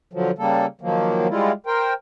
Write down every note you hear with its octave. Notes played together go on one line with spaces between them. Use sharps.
D3 F3 F#3
C#3 G3 A#3 A4
D#3 F3 F#3 A#3
G3 G#3 E4 F4
A#4 C5 G5